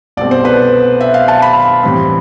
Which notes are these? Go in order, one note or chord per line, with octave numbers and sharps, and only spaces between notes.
C2 B2 A3 C4 D5
C5
B4
E5
F5
A5
B5
A2 E3 G3 C4